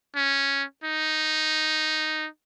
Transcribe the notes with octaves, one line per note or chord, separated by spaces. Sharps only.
C#4
D#4